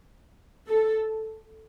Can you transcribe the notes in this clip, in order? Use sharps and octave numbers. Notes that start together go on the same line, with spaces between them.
A4